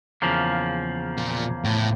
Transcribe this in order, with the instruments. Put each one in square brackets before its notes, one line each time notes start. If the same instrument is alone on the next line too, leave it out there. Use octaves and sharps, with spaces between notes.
[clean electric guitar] E2 C#3 F3 A#3
[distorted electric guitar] A#2
A2